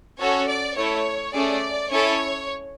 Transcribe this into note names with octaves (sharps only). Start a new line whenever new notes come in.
C#4 F#4 A4 C#5
D5
A3 E4 A4 C#5
A3 C#4 G#4 D5
C#4 E4 A4 C#5